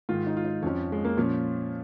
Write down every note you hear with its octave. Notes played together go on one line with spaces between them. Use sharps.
G#2 D#3 F4
D#4
F4
D#4
F2 F3 C#4
G#3
A#3
A#2 F3 C#4